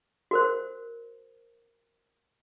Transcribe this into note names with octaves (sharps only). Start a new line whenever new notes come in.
F#4 A#4 C5